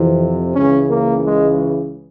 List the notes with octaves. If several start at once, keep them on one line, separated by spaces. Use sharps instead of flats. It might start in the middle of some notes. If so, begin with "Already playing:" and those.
Already playing: F2 C3 E3
C#2 C#3 E3 C#4
A#3
G#3